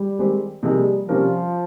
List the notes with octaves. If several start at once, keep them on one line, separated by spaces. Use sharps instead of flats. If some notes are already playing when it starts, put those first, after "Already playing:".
Already playing: G3
D#3 G#3 C4 G4 C5
C3 F3 G3 A#3 D#4 G#4
C3 F3 G3 C#4 G4 A#4